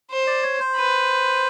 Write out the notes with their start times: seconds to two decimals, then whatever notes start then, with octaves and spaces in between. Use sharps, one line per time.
0.11 C5
0.27 D5
0.43 C#5
0.59 C5
0.76 B4